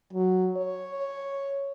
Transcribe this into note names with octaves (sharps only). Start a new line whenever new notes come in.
F#3
C#5